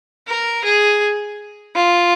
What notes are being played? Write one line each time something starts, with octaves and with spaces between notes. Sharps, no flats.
A#4
G#4
F4